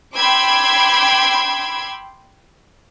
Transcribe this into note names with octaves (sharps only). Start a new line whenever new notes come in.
G5 B5 C6 D6 E6 G#6